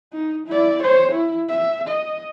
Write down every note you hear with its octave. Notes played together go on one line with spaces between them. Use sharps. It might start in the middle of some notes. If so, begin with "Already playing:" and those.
D#4
E4 D5
C5 C#5
E4
E5
D#5